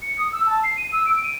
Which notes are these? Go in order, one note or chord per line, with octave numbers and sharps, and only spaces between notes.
C#7
D#6
E6
A5
C7
D#7
E6
D7
D#7